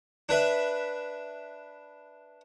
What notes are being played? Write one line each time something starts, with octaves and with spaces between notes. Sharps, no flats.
D4 B4 E5